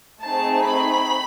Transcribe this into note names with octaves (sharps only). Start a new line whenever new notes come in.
A3 C4 D#4 G#4 A5
B5